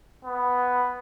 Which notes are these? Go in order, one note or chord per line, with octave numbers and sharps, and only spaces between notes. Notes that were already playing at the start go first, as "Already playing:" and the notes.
B3